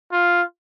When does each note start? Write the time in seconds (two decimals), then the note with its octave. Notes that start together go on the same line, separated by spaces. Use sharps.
0.12 F4